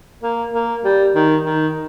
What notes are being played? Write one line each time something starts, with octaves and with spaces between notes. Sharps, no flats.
A#3
A#3
G3
D#3
D#3